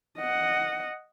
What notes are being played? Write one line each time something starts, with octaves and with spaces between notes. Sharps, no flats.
D#5 F#5